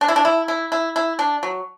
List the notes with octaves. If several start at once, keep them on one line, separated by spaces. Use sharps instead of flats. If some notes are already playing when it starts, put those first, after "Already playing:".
D4
E4
D4
E4
E4
E4
E4
D4
F#3